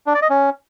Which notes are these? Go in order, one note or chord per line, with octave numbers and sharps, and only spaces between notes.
D4
D5
D#5
C#4